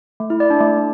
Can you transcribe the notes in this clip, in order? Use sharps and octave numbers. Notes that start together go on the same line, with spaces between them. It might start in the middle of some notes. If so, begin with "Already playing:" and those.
A3
E4
D5
D4
A3